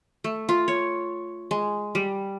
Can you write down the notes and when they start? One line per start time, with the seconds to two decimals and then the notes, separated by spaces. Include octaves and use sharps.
0.24 A3
0.49 F4
0.68 C#5
1.51 G#3
1.95 G3